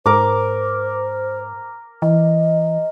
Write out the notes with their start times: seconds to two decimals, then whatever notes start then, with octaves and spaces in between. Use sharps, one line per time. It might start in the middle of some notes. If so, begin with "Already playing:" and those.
0.06 G#2 A#4 C5 D6
2.02 E3 D#5